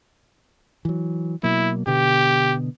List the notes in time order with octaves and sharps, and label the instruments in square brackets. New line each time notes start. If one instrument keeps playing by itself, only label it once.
[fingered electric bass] E3 F#3
[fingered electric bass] B2 F#3 A#3 [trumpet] E4
[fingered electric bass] B2 D3 B3 [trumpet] G4